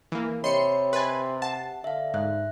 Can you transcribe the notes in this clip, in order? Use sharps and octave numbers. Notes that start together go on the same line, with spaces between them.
E3 A#3
C3 C#5 D#5 B5 C6 C#7
B4 G#5 C6 A6
F#5 A5
D3 E5 F5
G#2 E5 F#6